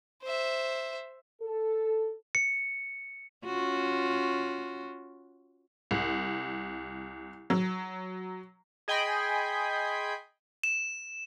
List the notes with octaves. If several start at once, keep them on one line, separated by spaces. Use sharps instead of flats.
C5 E5
A4
C#7
C#4 F4 F#4
C2
F#3
G#4 D#5 G5 G#5 B5 C6
E7